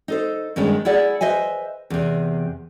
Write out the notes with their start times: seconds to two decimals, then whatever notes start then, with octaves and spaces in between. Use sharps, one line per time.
0.08 D#4 A4 C5
0.56 G2 D#3 G#3 B3 C#4 D4
0.85 E4 G#4 D5 F#5
1.21 B4 C5 D#5 E5 G#5
1.90 E2 C3